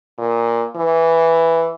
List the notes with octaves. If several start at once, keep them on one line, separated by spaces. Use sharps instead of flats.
A#2
E3